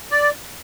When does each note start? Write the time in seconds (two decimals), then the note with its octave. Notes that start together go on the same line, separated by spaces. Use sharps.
0.11 D5